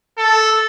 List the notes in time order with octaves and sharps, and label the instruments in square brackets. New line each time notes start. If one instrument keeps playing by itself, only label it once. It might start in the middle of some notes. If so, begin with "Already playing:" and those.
[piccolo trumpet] A4